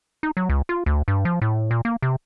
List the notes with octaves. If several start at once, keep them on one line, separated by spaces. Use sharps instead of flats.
D#4
F#3
C#2
F4
D2
G2
F3
A2
A#2
A#3
C3